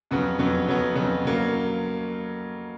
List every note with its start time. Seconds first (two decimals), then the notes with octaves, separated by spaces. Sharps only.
0.11 F2 C#3 F#3 B3
0.39 F2 C#3 F#3 B3
0.66 F2 C#3 F#3 B3
0.95 F2 C#3 F#3 B3
1.25 C#3 F#3 A#3